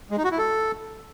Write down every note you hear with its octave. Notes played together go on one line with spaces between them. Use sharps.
G#3
D#4
F#4
E4
A4